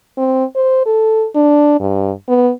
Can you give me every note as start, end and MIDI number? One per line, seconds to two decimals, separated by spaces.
0.18 0.45 60
0.55 0.83 72
0.86 1.27 69
1.35 1.76 62
1.80 2.12 43
2.29 2.51 59